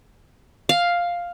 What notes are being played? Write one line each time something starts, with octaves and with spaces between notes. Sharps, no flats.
F5